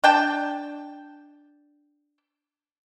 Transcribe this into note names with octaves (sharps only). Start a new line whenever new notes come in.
D4 G5 A5